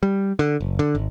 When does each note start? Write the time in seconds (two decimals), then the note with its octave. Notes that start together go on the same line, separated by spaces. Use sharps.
0.03 G3
0.39 D3
0.61 F#1
0.79 D3
0.95 G#1